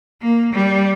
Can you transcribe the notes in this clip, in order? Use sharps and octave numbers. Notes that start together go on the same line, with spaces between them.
A#3
G3